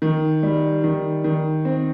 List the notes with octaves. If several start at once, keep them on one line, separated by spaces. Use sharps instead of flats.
D#3
G3
D#3
D#3
C4